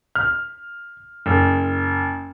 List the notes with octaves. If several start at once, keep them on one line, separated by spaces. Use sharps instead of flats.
F6
F#1